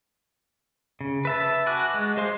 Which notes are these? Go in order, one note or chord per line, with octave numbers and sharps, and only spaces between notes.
C#3
B4 E5 A5
F#4 G#5 D6 F#6
G#3
G#4 C5 F5 C6